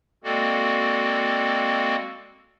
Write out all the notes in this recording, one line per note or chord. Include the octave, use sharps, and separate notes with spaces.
G#3 A#3 C4 F#4 A4 D5